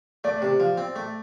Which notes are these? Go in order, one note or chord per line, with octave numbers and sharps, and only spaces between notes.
A3 D5
C3
F3
C4
A3